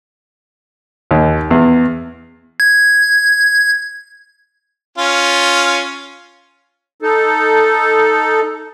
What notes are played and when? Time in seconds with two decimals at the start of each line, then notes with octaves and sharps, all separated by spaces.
1.11 D#2
1.51 E2
2.60 G#6
4.98 C#4 F4
7.02 D#4 A4